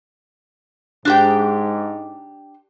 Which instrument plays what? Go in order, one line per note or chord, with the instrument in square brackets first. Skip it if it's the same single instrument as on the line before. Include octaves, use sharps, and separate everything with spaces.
[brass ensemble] G#2 [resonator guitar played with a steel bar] D4 G4 G5